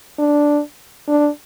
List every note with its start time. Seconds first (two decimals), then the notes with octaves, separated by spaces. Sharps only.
0.19 D4
1.08 D4